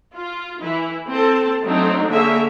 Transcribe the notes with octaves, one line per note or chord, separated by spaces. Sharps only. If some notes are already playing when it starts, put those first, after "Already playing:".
F4
E3 E4
C4 A4 A5
F#3 A3 C4 D4 D#4
D3 A#3 G#4 C#5 E5